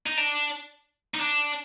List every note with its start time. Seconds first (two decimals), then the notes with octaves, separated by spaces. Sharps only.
0.06 D#4
0.17 D4
1.15 D#4
1.20 D4